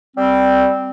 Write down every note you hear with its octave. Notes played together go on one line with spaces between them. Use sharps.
G3 C4